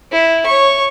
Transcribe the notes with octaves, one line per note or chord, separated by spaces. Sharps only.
E4
C#5 C#6